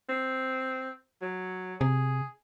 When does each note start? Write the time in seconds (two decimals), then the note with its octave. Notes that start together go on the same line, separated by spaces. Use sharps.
0.09 C4
1.22 F#3
1.81 C3 G#4